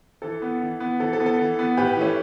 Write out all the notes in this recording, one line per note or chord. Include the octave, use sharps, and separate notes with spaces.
E3 A4
B3
E3
B3
E3 A4
A4
B3
A4
E3
B3
A2 G4 B4
E3 A3 C#4